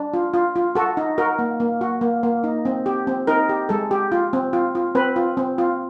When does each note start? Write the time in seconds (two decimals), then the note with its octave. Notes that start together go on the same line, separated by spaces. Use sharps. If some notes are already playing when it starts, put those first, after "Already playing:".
Already playing: D4
0.14 F4
0.34 F4
0.56 F4
0.75 F#4 A4
0.97 D#4
1.18 F#4 A#4
1.39 A#3
1.60 A#3
1.81 F#4
2.01 A#3
2.23 A#3
2.44 D#4
2.65 C4
2.86 G4
3.07 C4
3.27 D#4 A#4
3.49 G4
3.69 G#3 A4
3.91 G4
4.12 F4
4.33 C4
4.53 F4
4.75 F4
4.95 C4 B4
5.16 F4
5.37 C4
5.58 F4